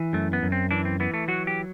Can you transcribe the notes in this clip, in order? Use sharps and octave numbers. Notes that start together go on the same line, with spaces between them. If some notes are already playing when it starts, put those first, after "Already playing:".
Already playing: E3
F#2 A3
B3
F#2
C4
E3 D4
C4
E3 B3
A3
F#3 F#4
G4